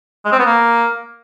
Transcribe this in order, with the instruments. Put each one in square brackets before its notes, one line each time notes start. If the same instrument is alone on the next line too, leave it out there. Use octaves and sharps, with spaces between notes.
[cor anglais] G#3
C4
B3
A#3